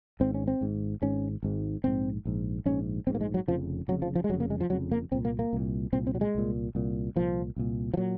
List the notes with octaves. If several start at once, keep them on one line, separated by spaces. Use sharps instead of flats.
G#1 G#2 C4
C#4
C4
G#1 G#2
G#1 G#2 C#4
G#1 G#2
A#1 G#2 C4
A#1 G#2
A#1 G#2 C#4
A#1 G#2 C4
A#3
G#3
F#3
F1 F2 C#3 F3
F1 F2 C#3 F#3
F3
F3
G#3
F1 F2 C#3 F#3
A#3
G#3
F3
F1 F2 C#3 F#3
A#3
C2 A#2 C4
A#3
A#3
C2 A#2
C2 A#2 C4
C4
F#3
G#3
C2 A#2
C2 A#2
C2 A#2 F3
C2 A#2
F3
A#2 F#3